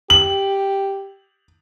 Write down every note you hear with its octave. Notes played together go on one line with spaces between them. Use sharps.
G4 F#7